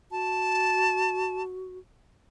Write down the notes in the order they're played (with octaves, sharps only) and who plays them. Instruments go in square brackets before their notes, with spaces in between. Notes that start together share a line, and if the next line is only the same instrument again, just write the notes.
[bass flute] F#4 [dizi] A5